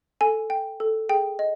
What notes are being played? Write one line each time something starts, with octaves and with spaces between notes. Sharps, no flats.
A4 G#5
G5
A4
G#4 G5
D#5